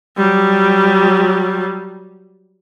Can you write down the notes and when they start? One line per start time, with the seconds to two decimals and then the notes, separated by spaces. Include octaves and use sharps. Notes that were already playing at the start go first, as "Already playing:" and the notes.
0.18 F#3 G3